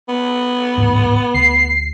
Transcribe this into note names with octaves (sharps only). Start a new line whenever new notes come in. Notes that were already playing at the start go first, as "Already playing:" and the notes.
B3
D1 A1 G#2
D2 C7